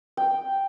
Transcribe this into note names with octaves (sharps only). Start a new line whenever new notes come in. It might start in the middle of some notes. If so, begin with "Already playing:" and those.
G5